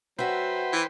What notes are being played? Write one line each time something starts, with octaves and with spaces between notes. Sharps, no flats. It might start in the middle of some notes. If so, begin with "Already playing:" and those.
F#3 F#4 B4 C5 E5 G5
E3